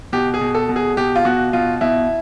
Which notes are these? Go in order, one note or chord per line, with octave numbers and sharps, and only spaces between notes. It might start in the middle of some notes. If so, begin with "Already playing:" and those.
B2 G4
G#4
B2
A4
B2
G#4
B2 G4
F4
B2 F#4
B2 F4
B2 E4